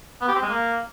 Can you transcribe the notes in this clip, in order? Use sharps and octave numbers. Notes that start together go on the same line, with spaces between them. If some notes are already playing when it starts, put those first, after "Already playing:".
B3
G4
C4
G#3
A#3